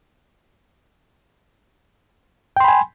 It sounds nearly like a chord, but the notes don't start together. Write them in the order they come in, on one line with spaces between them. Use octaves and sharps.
G5 C6 B5 G#5